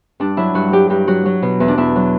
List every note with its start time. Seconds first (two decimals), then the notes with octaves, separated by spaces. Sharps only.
0.20 G2 D4
0.37 F#3 E4
0.55 G2 F#4
0.72 F#3 G4
0.90 G2 G4
1.08 F#3 F#4
1.26 F#3
1.42 B2
1.60 E2
1.68 D4
1.77 E2 E4
1.96 F#3